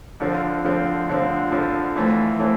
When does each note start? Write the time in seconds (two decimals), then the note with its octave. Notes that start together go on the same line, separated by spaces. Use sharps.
0.20 F2 D3 F3 C4
0.64 F2 D3 F3 C4
1.08 F2 D3 F3 C4
1.51 F2 D3 F3 C4
1.95 F2 E3 A3 C4
2.39 E3 A3 C4